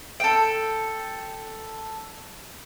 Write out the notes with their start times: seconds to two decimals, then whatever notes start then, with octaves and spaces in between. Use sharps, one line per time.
0.20 A4 G5